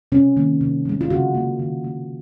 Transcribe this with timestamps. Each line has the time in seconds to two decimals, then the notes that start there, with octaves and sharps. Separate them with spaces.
0.12 C3 C#4
0.37 D#3 A#3
0.61 C3
0.85 F3 G#3
1.01 F4
1.10 C#3 F#4
1.35 F3 A#3
1.59 D#3
1.84 A#3